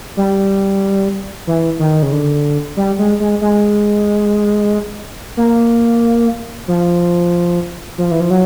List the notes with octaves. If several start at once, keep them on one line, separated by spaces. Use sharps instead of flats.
G3
E3
D#3
C#3
D3
G3
G#3
G#3
G#3
A#3
F3
F3
E3
F3
F#3